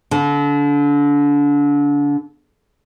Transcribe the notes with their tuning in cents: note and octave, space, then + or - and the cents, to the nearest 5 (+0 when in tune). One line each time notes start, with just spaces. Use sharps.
D3 -30